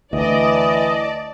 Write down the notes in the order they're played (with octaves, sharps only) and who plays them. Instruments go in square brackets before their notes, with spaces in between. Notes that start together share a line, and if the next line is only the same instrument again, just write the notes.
[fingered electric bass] D2 [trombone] E3 [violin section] D5 A5 [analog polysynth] D#5